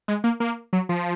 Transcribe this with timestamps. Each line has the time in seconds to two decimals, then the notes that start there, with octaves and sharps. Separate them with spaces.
0.08 G#3
0.24 A#3
0.40 A#3
0.73 F#3
0.89 F3